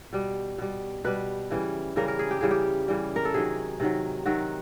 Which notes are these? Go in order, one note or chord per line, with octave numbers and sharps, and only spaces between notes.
B2 G3
B2 G3
B2 G3 B4
C#3 E3 G3
C#3 E3 G3 A#4
A#4
G#4
G4
C#3 E3 G3 G#4
G4
C#3 E3 G3
A#4
A4
C3 D#3 F#3 G#4
C3 D#3 F#3
C3 D#3 F#3 F#4